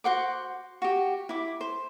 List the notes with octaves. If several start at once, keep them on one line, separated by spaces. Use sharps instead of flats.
F#4 C5 F#5 D6
F#4 G4
E4 D6
C5